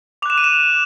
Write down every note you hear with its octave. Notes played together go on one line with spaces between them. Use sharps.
D6 F#6 E7 F7
D#7
E7